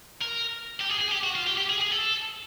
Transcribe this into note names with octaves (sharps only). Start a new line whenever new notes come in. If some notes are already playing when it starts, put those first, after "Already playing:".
A#4
G4
G#4
G#4
G4
F#4
F4
G4
G4
G#4
G#4
A4